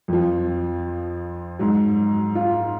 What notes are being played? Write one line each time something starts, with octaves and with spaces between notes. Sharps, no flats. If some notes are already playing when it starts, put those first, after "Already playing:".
F2 F3
G#2 F#3
F4